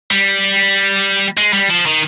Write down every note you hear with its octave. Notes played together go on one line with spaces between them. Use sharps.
G3
G#3
G3
F3
D#3